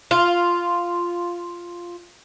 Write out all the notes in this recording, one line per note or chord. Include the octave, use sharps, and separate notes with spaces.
F4